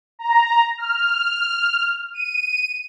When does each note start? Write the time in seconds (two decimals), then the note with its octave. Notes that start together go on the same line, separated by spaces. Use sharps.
0.19 A#5
0.78 F6
2.14 D#7